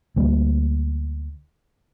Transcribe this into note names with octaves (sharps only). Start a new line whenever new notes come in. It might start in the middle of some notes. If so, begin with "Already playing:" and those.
D2 G3 A#3